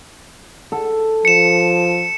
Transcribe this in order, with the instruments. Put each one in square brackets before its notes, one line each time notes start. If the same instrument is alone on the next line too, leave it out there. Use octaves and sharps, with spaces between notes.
[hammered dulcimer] A4
[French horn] F3 [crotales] C#7 E7